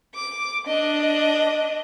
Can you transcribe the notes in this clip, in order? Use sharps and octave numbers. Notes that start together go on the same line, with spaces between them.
D6
D4 D#5